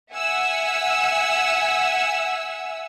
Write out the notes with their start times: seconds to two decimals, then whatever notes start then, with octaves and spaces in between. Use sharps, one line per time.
0.13 E5 F#5 G#5 E6